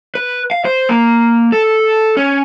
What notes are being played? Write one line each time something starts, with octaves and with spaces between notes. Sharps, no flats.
B4
F5
C5
A#3
A4
C#4